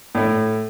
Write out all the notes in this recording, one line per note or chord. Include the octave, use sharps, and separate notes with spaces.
A2